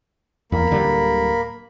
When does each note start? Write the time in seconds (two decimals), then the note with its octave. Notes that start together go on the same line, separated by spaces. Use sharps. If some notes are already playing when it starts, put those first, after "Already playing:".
0.52 E2 A#3 B5
0.71 D1 D3 G3